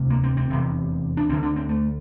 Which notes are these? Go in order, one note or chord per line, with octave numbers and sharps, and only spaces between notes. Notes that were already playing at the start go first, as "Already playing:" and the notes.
Already playing: E1 D2 C3
A#3
C4
C4
F1 E2 C3
D4
D2 D3 C4
D4
C4
A3